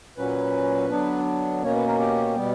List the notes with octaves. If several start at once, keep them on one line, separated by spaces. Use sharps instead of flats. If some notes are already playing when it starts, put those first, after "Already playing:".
A#2 F#3 C#4 B4
D3 F#3 B3 D4
B2 A#3 C#4 C#5
B4
A#4
G4
B2 G3 B3